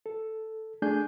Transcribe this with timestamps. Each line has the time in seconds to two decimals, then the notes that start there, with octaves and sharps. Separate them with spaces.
0.06 A4
0.82 A3 D4 G#4 G#5 G6